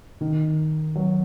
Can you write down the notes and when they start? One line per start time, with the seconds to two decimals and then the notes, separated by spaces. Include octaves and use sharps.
0.21 D#3
0.96 F#3